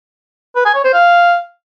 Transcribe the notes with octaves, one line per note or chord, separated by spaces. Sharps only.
B4
G#5
C#5
C5
F5